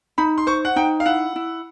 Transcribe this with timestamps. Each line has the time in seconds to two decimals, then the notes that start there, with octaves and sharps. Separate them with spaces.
0.18 D#4 B5
0.38 C6
0.47 C5 C#6
0.65 F#5
0.76 D#4 G5
1.00 F5
1.05 E4 F#5
1.36 E4